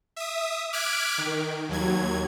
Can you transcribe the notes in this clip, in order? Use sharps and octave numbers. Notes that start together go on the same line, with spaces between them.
E5 D#6
D6 F6 F#6 G#6 B6 D7
D#3
D#2 F#3 G#6